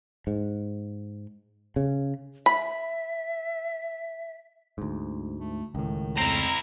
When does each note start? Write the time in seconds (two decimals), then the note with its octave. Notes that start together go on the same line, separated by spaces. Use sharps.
0.27 G#2
1.76 C#3
2.46 E5 B5
4.78 D2 G#2
5.40 A3
5.75 C#2 A2 D#3
6.18 F2 C4 E4 A#5